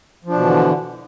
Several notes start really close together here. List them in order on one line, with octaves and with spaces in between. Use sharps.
F3 D4 B2 E3 D3